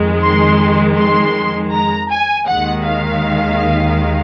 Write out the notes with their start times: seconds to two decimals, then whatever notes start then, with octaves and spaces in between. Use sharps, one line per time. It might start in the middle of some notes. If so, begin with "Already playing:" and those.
Already playing: F2 D#3 G#3
0.22 C6
0.98 C6
1.72 A#5
2.11 G#5
2.48 D#2 D#3 G#3 F#5
2.86 F5